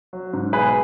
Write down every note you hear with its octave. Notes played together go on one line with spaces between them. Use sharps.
F#3
G#2
B1 G#4 B4